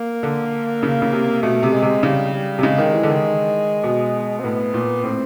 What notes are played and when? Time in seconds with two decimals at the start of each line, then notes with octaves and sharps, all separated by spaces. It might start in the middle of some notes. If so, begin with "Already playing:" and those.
Already playing: A#3
0.23 D3
0.83 C#3
1.02 C#3
1.13 C3
1.42 B2 A3
1.63 C3
1.72 G#3
1.82 C3
2.03 C#3 G3
2.33 G3
2.59 C3
2.63 C#3 G#3
2.78 D#3
2.93 E3
3.03 D3
3.09 D#3
3.84 B2
4.40 C4
4.44 A2 B3
4.74 A#2
5.04 A2 C4